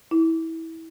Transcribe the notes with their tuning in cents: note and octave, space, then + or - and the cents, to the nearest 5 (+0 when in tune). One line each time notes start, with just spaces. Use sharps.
E4 -20